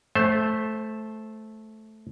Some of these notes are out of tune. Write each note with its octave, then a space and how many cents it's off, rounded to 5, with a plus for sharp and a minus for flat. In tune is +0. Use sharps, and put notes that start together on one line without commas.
A3 -10 C5 +10